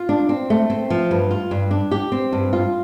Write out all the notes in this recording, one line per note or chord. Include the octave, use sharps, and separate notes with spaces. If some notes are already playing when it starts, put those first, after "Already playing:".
Already playing: F4
D4
C4
A3
C4
F3
G2
F4
G2
D4
G4
C4
G2
F4